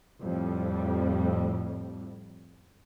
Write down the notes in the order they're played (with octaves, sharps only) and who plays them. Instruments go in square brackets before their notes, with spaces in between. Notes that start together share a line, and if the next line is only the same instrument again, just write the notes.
[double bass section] F2 A2 G3